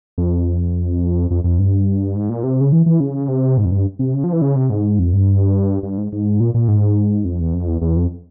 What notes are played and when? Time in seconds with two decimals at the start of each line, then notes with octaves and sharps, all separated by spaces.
0.18 F2
1.31 F2
1.44 F2
1.59 G2
2.16 G#2
2.29 A#2
2.44 C3
2.61 C#3
2.72 E3
2.86 E3
3.00 C#3
3.28 C3
3.58 G#2
3.65 F2
3.72 G2
3.99 C3
4.14 C#3
4.24 F3
4.33 E3
4.42 C#3
4.56 C3
4.70 G#2
4.99 F2
5.13 G2
5.83 G2
5.98 G#2
6.13 G#2
6.40 A#2
6.54 A#2
6.68 G#2
7.25 F2
7.40 E2
7.54 F2
7.68 E2
7.81 E2
7.97 F2